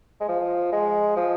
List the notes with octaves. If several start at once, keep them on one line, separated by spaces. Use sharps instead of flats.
G#3
F3
G#3
F3